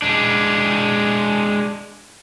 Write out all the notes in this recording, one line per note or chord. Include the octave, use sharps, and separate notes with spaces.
G#3 D4